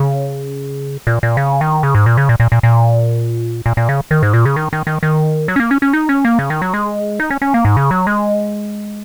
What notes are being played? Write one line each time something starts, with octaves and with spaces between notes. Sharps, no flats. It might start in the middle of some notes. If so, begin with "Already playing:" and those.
Already playing: C#3
A#2
A#2
C#3
D#3
C#3
G#2
A#2
C#3
A#2
A#2
A#2
A#2
A#2
A#2
C#3
D#3
G#2
A#2
C#3
D#3
D#3
D#3
D#3
F#3
C#4
A#3
C#4
C#4
D#4
C#4
A#3
C#3
D#3
F#3
G#3
D#4
C#4
C#4
A#3
G#2
C#3
F#3
G#3